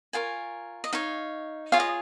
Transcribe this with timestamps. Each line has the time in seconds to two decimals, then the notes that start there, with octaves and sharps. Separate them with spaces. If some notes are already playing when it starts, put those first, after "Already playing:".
0.13 F4 A#4 C#5 G#5
0.84 D#5
0.93 D#4 C#5 F5
1.72 F4 G#4 C#5 F5
1.80 D#5